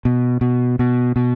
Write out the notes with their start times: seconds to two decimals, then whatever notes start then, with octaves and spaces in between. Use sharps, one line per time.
0.05 B2
0.41 B2
0.79 B2
1.16 B2